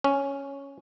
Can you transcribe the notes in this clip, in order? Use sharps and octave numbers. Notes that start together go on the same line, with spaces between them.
C#4